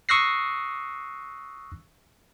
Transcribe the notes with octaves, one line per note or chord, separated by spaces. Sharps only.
C#6 D#6 E6 F#6 A#6 C7